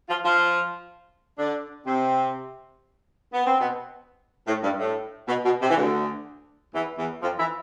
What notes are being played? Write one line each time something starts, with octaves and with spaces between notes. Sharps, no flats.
F3 F4
F3 F4
D3 D4
C3 C4
B3
C4
B2 B3
A2
G2
A2
B2
B2
C3
E3
D2 D3
E2 E3
E2 E3
F2 F3
E3 E4